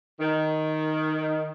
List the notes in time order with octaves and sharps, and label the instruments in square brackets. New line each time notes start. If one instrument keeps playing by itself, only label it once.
[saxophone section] D#3